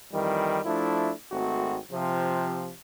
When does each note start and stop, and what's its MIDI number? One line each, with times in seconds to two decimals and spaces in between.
0.12 0.60 41
0.12 0.60 51
0.12 0.60 52
0.12 0.60 55
0.64 1.11 53
0.64 1.11 57
0.64 1.11 62
0.64 1.11 64
1.31 1.77 32
1.31 1.77 57
1.31 1.77 60
1.31 1.77 66
1.91 2.70 48
1.91 2.70 53